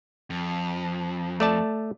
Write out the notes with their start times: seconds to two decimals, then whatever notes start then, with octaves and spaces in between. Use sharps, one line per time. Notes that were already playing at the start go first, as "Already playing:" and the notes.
0.30 F2
1.40 A3 D5 A5